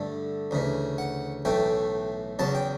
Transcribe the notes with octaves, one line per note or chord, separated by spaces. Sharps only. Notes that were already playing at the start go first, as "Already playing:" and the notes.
Already playing: G2 D3 A3
D2 C#3 E3
F#5
B1 A2 E3 A3 G5
E2 C#3 F#3 A5
G5